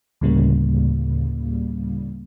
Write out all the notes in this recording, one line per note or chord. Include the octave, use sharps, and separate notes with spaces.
D2 A2 C#3 G3 A#3